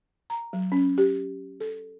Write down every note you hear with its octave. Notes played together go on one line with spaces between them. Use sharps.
A#5
F#3
C#4
G4
A4